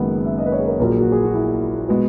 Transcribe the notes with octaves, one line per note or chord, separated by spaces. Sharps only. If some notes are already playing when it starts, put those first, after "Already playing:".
Already playing: F#1 F#2 D#3 G#3 B3 F#5
E5
D#5
B4
C#5
G#4
A#4
A#1 A#2 F#3 A#4
G#4
F#4
G#4
F#4
E4
B2 G#3 B3 F#4